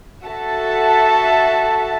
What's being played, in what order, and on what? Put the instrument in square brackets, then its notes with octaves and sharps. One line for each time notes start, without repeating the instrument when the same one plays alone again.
[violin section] F#4 A4 E5 A5